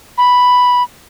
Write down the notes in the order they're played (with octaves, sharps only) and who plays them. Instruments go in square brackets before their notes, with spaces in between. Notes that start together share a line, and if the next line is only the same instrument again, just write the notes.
[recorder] B5